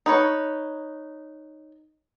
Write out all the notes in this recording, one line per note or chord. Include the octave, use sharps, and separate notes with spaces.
D#4 B4 C#5